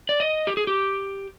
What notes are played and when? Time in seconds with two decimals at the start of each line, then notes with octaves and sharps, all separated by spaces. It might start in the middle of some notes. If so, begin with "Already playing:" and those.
0.09 D5
0.20 D#5
0.47 G4
0.57 G#4
0.67 G4